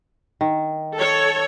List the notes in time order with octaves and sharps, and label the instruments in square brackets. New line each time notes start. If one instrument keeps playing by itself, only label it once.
[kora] D#3
[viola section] A4 C#5